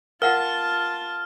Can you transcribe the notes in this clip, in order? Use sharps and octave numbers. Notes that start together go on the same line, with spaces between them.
F4 A#4 F5 F#5 A5 F6